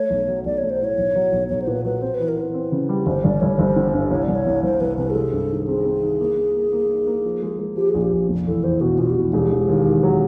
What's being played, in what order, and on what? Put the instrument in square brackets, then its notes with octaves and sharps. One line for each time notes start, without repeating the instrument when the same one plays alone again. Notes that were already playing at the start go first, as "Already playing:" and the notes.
Already playing: [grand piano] A3 [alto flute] C#5
[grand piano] B1
F#3
[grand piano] B1 [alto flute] D5
[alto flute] C#5
[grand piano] A3
[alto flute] C5
[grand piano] A2 [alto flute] C#5
[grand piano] B1
F#3
B1
[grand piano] B1 [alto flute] C#5
[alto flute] C5
[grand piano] A#2 [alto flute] B4
[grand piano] F#3 [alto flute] B4
[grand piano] C4 [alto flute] C5
[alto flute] B4
[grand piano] E3
[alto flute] A#4
[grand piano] E3 [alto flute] B4
[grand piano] C4
C#3
G3
[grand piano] G1 [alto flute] C5
[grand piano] G1 [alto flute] D5
[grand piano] G1 [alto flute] C#5
[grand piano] G1 [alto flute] C5
[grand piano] D3
G2
[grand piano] C2 [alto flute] C#5
[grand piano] C2 [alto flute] D5
[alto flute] C#5
[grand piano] C2
[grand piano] C2 [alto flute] C5
[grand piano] C2 [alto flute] B4
[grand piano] C3 [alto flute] B4
[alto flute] G#4
[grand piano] G#3 [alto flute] A4
[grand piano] G2
D#3
[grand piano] C4 [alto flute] G#4
[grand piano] C4
D#3
A#3
A#3
A#3
A#3
D#4
A#3
F3
G#3
G#3
[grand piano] F3 [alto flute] G4
[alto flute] G#4
[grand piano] A#1
[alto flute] G4
[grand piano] A#1
F1
[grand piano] E2 [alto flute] A4
[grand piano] E2 [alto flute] C5
[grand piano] B2 [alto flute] F#4
[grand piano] B2 [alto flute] F4
[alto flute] G4
[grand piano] E2 [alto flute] F#4
[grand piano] E1 [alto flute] G4
[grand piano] E1
D#2
D#3
F#3